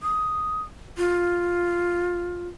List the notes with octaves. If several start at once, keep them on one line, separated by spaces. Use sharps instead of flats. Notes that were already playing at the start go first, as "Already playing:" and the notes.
D#6
F4